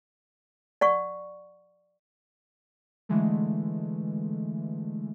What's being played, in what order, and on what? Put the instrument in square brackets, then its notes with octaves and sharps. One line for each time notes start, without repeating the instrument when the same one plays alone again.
[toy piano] D5 F#5 C#6
[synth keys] D3 E3 G#3 A3